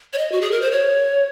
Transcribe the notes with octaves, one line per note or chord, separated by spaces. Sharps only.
C#5
D#5
F#4
G#4
A#4
C5
C#5